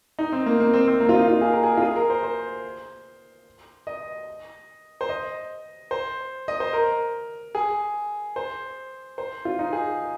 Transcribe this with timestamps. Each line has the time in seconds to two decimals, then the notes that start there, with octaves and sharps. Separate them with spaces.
0.19 D#4
0.32 C4
0.46 A#3
0.60 A#3
0.74 C4
0.88 C4
1.00 A#3
1.09 F4
1.14 D#4
1.28 F4
1.41 G#4
1.52 A#4
1.63 G#4
1.77 F4
1.82 G#4
1.96 A#4
2.10 C5
2.23 C5
3.87 D#5
5.01 C5
5.09 D#5
5.91 C5
6.48 D#5
6.60 C5
6.73 A#4
7.55 G#4
8.36 C5
9.18 C5
9.45 F4
9.59 D#4
9.73 G#4